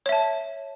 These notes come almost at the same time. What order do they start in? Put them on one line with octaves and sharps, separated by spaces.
C#5 E5 A5